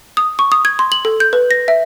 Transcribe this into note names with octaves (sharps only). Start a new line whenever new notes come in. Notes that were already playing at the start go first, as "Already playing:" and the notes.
D#6
C#6
D#6
G#6
C6
F#7
A4
G6
B4
A#6
E5